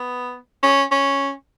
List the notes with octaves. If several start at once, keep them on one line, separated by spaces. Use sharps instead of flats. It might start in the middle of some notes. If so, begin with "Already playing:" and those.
Already playing: B3
C#4
C#4